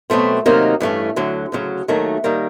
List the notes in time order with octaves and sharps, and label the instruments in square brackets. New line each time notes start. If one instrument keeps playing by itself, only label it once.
[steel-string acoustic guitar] B2 F#3 A3 C4
C3 D#3 F#3 A#3 D#4
G2 E3 A3 C#4
D2 D3 F#3
D2 C#3 F#3
D#2 D#3 F#3 A3
D#3 G3 A#3